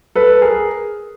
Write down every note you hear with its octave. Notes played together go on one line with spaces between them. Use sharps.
A4 B4
G#4 A#4